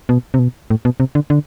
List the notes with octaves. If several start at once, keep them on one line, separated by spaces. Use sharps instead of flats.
B2
C3
B2
A2
B2
C3
D3
D3